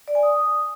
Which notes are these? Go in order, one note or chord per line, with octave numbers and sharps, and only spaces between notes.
D5
G#5
D#6